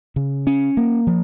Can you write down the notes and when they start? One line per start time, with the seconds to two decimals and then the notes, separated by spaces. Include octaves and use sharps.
0.16 C#3
0.47 C#4
0.77 A#3
1.07 F3